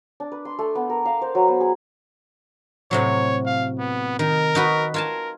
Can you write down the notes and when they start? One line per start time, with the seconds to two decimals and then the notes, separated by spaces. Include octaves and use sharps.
0.20 D4
0.32 B4
0.45 C6
0.59 A3
0.75 B3
0.90 A#4
1.05 F5
1.22 C5
1.35 F#3
1.48 B3
1.61 G#4
2.91 A2 C3 F#3 C#5
3.46 F5
3.79 B3
4.19 D#3 A#4
4.55 D#4 F#4 B4
4.94 F4 A#4 G#5 A5